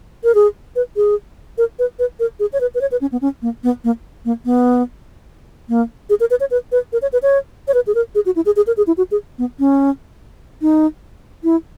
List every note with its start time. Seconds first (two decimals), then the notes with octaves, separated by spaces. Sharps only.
0.24 A#4
0.35 G#4
0.76 B4
0.96 G#4
1.58 A#4
1.79 B4
1.99 B4
2.20 A#4
2.40 G#4
2.53 C#5
2.60 B4
2.75 B4
2.81 C#5
2.92 B4
3.01 C#4
3.12 B3
3.22 C#4
3.42 A#3
3.64 B3
3.84 A#3
4.25 A#3
4.45 B3
5.69 A#3
6.10 G#4
6.20 A#4
6.30 B4
6.40 C#5
6.51 B4
6.72 B4
6.93 A#4
7.02 C#5
7.13 B4
7.23 C#5
7.68 C#5
7.74 B4
7.87 G#4
7.95 A#4
8.15 G#4
8.26 F#4
8.36 E4
8.46 G#4
8.56 G#4
8.67 A#4
8.77 G#4
8.87 E4
8.97 F#4
9.11 G#4
9.38 B3
9.59 C#4
10.62 D#4
11.44 E4